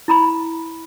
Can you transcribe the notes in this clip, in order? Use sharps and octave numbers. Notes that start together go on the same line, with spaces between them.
E4 A#5 B5